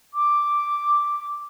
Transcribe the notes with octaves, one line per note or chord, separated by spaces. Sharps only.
D6